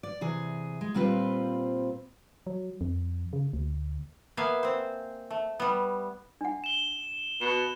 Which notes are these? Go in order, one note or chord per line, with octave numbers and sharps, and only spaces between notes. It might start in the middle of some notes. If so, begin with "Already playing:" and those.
D5
C3 E3 G#4
G#3
A#2 G3 C4 F4 B4 C5
F#3
F2
C#3
D2
A#3 B3 E5 F5 G#5
C4 C5
A3
G3 B3
D4 F#5
E7 G7
B2 E7